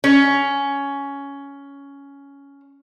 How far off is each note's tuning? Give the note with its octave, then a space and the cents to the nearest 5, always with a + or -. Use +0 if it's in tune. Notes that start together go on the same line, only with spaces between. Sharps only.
C#4 +10